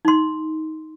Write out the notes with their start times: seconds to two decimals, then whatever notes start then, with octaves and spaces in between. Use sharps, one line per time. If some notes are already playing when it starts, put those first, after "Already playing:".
0.05 D#4 C6